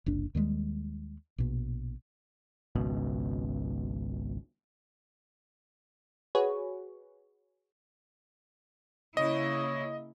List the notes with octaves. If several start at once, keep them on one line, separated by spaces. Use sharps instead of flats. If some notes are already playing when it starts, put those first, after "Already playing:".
F#1 C2 D4
D#2 D#3 G3 G#3
A#1 B2
G#1 C#2 B2
F#4 G#4 B4 C#5
C#3 A#3 E4 C#5 D#5